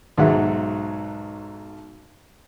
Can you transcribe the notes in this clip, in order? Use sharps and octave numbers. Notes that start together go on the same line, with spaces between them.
B1 G#2 F#3 F#4 E5 F#5